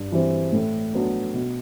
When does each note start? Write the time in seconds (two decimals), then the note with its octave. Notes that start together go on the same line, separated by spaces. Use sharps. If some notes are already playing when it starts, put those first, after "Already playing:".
Already playing: G2
0.12 E3 G3 C4
0.53 A2
0.93 F#3 B3 D4
1.34 B2